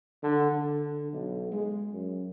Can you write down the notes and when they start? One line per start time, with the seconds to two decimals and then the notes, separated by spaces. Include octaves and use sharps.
0.23 D3
0.52 D3
1.13 B1
1.52 G#3
1.93 F#2